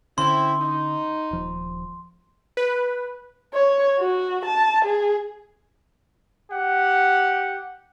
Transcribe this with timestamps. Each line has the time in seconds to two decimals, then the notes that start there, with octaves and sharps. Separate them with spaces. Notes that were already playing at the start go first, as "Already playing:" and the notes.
0.18 D3 C4 C#4 E4 C6
0.60 D#4
1.31 D#1 F3
2.57 B4
3.54 C#5
3.99 F#4
4.45 A5
4.85 G#4
6.52 G4 F#5